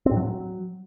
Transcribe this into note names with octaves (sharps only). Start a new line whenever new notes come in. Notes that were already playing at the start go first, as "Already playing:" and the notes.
C4
A2
F#3